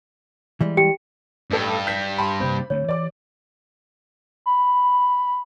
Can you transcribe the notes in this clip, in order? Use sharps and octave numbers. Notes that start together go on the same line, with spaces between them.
E3 G3 G#3
G4 G5 C#7
A1 G2 A4
G6 B6
G5 A5 B5 C6
C3 A#3 C4 C5 G6
D3 A3 C4 C#5
E3 D5 D6
B5